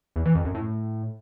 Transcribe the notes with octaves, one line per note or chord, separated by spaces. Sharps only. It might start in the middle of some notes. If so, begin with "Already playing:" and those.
E2
E3
F2
F#2
A2